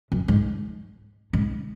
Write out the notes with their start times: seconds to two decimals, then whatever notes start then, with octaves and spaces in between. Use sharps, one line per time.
0.12 F#2
0.28 G#2
1.33 G#2